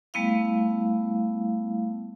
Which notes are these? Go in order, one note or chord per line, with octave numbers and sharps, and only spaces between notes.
G3 A3 B3 E4 F5